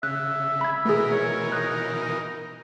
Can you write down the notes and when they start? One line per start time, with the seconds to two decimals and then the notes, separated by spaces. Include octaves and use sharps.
0.03 C#3 E5 F#6
0.61 B5 G#6
0.85 B2 E3 A3 G#4 A#4
1.11 C#5
1.52 D#4 F#6